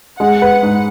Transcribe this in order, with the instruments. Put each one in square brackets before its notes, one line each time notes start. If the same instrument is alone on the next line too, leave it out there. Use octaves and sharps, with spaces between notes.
[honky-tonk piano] G#3 [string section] F#5
[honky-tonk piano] B4
G#2